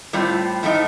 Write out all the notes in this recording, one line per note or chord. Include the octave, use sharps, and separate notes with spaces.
A2 G3 C4 F4
A2 F3 A3 D#4